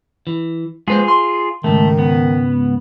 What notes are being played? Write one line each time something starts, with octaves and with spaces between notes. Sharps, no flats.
E3
G#3 F4 G#4 B4 C5
C6
C#2 G#2 D#3 A3
B3